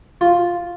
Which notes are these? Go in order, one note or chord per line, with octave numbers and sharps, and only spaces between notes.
F4